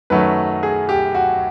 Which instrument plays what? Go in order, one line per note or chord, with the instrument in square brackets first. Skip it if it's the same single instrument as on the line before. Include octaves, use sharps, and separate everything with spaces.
[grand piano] F#2 D#3 F#3 A3 B4
G#4
G4
F#4